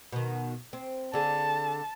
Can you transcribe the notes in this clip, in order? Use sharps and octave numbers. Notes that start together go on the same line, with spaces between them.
B2 D#3
C4
D3 G#4 A5